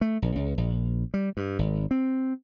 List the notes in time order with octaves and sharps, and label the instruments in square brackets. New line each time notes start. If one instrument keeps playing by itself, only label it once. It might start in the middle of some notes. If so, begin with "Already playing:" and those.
[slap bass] A3
A#1
C#2
A#1
G3
G2
G#1
C4